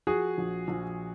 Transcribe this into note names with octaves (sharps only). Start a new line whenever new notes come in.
F3 F#4 G#4
A#1
A#1